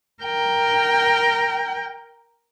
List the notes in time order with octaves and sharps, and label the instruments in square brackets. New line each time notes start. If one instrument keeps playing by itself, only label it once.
[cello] A#4 G5